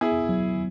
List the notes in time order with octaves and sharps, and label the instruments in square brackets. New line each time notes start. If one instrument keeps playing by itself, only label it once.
[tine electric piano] B3 [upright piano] E4 G#4
[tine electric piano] F#3